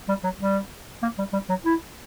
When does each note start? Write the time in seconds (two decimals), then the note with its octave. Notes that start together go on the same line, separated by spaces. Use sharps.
0.08 G3
0.24 F#3
0.39 G3
1.03 A#3
1.18 G3
1.33 G3
1.49 F#3
1.65 E4